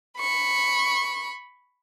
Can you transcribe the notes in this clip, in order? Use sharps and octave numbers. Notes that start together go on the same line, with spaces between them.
B5 C#6